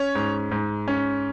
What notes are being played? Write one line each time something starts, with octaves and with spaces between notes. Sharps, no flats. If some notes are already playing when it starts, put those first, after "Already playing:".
Already playing: C#4 C#5
G#2
G#2
C#4